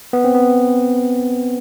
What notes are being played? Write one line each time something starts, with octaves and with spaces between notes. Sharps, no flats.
B3
C4
B3